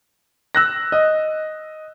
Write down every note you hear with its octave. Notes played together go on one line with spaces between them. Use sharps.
E6 F#6 A#6
D#5